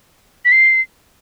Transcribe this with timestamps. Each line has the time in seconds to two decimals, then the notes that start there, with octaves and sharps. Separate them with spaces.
0.45 B6
0.52 C7